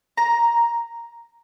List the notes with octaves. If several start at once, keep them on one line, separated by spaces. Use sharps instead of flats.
A#5